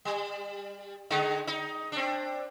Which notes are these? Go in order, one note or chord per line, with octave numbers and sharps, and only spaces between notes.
G3
D3 G#3 D#4
D#4
C4 D4